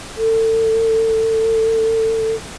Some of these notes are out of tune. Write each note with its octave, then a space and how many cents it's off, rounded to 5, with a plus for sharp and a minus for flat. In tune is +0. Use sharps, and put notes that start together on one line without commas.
A4 +30